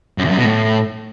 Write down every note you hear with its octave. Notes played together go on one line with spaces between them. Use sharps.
F#2
E2
F#2
B2
A2